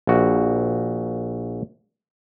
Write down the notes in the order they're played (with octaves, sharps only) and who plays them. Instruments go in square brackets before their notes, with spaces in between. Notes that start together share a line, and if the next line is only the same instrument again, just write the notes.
[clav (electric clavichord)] A#1 F#4